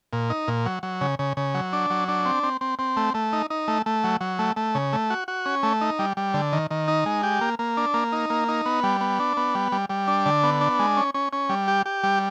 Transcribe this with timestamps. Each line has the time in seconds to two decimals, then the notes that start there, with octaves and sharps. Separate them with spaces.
0.13 A#2
0.30 D#4
0.48 A#2
0.66 F#3
0.83 F#3
1.01 C#3
1.19 C#3
1.37 C#3
1.54 F#3
1.73 D4
1.90 F#3
2.08 D4
2.25 C4
2.43 C4
2.61 C4
2.79 C4
2.97 A3
3.14 A3
3.33 D#4
3.50 D#4
3.68 A3
3.86 A3
4.04 F#3
4.21 F#3
4.39 A3
4.56 A3
4.75 C#3
4.93 A3
5.10 F#4
5.28 F#4
5.46 C#4
5.63 A3
5.81 D#4
5.99 G3
6.17 G3
6.34 D3
6.53 D#3
6.71 D#3
6.88 D#4
7.06 G#3
7.23 G4
7.41 A#3
7.59 A#3
7.77 D4
7.94 A#3
8.12 D#4
8.30 A#3
8.48 D#4
8.66 B3
8.83 G3
9.01 B3
9.19 D4
9.37 B3
9.55 G3
9.72 G3
9.89 G3
10.08 D4
10.26 D3
10.43 B3
10.61 D4
10.79 G#3
10.97 C#4
11.14 C#4
11.33 C#4
11.49 G3
11.68 G4
11.86 G4
12.03 G3